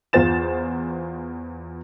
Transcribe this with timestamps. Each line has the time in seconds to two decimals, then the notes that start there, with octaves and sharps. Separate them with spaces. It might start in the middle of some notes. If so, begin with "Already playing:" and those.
0.13 E2 F4 C5 A6 E7